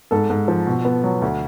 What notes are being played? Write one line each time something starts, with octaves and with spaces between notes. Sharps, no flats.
G#2 A4
G#2
F3
B2
B3
F#3
D2